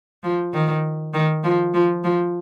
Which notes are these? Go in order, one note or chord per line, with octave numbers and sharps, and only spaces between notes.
F3
D#3
D#3
F3
F3
F3